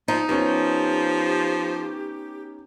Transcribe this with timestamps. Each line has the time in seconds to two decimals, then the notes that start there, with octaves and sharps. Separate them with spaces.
0.08 F3 D#4
0.28 F3 B3 C#4 G4